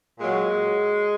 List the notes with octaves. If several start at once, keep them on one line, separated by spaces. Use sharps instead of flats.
A#2 F#3 G#3